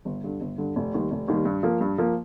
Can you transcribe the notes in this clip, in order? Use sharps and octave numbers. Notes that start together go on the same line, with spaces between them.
G1
G2 D3
G1
G2 D3
F1
D#2 D#3 G3
F1
D#2 D#3 G3
G2
F3 A#3
G2
F3 A#3